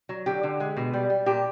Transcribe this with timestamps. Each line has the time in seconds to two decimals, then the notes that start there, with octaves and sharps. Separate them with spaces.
0.09 F#3
0.26 D3 G4
0.43 D3
0.60 G#3
0.77 B2
0.94 G3
1.10 G3
1.26 A#2 G4